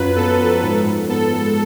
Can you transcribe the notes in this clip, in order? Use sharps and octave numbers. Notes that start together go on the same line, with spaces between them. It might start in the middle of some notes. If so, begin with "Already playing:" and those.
Already playing: F#2 F4 B4
B3 A4
F3
G#2
G#2
B3 A4
G#3